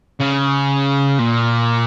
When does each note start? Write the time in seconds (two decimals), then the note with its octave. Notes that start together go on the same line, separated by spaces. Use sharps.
0.20 C#3
1.19 A#2